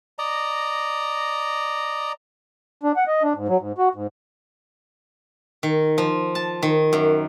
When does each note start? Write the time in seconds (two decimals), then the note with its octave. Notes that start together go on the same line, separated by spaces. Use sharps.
0.19 D5 D#5 A#5
2.83 D4
2.96 F#5
3.07 D#5
3.23 D4
3.35 G#2
3.48 F#3
3.60 G#2
3.78 F#4
3.95 G#2
5.63 D#3
5.98 F3
6.35 A5
6.63 D#3
6.93 F#2